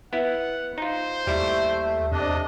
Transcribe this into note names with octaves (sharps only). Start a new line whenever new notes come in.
B3 E4 F#5
D#4 F4 C5
D#2 G3 A3 E4
E2 C3 D4 D#5